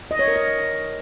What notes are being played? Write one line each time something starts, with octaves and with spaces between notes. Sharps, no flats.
D#5
C#5
A#4
D#5